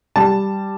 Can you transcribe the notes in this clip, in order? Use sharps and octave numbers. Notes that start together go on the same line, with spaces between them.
G3 A5